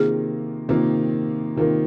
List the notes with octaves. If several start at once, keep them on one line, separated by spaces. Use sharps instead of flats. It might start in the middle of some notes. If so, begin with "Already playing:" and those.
Already playing: C3 D#3 A#3 F4 G#4 A#4
C3 D#3 A#3 F4 A#4
C3 D#3 A#3 F4 A#4